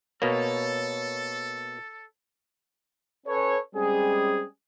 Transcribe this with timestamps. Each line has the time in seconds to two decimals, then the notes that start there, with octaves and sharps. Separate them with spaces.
0.22 B2 A#3 A4 C#5
3.27 C#4 A4 B4 C#5
3.75 G3 G#3 C4 C#4 G#4